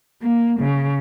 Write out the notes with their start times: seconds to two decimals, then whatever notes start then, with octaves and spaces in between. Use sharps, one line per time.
0.20 A#3
0.59 C#3